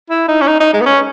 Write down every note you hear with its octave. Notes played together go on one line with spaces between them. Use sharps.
E4
D#4
C#4
D#4
D#4
G#3
B3
C#4